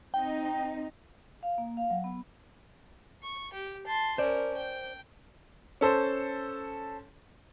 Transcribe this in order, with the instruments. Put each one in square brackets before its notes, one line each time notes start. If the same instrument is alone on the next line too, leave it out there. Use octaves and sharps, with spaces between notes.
[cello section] C4 D#4 [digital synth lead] G5
[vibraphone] F5
A#3
F5
F#3
B3
[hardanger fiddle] C#6
G4
A5 C6
[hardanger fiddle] C#4 A#4 [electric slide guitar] C5 D5
[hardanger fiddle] G5
[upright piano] C#4 A4 C5